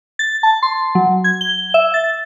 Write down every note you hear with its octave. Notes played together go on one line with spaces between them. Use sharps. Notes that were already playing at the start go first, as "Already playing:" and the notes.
A6
A5
C6
F#3
G#6
G7
E5
A6